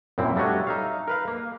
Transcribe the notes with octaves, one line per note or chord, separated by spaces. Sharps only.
F#2 A#2 C4 E4
G3 A3 D4 F#4 C#5 D#5
D#4 E5 F5
A#4 B4 F5
A#3